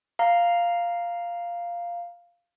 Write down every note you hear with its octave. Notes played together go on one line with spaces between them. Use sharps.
F5 A#5